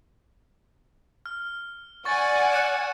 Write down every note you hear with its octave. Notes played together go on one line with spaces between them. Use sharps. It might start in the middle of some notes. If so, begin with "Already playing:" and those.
F6
D5 F#5 G#5 C#6 A6
F#6 C#7 E7